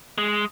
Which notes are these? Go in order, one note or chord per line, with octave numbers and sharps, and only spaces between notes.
G#3